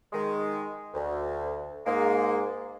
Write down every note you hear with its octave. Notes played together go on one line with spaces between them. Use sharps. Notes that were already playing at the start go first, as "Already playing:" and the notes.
D#3 G#3
D2
G#2 G#3 A#3